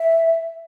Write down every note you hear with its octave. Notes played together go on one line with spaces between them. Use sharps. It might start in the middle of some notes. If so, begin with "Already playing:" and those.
Already playing: E5